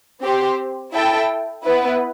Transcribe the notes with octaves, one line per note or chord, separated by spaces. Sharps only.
C4 G4 C5
E4 A4 E5 G5
B3 E4 B4